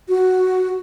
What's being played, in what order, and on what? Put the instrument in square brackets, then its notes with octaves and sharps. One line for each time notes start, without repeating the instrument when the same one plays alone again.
[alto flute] F#4